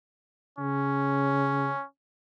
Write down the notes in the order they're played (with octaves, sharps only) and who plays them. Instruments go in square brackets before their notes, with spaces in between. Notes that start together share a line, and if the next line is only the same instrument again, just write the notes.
[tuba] C#3 [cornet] C#4